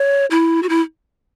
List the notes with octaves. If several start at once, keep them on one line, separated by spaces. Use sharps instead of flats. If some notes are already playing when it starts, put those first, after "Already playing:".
Already playing: C#5
E4
F#4
E4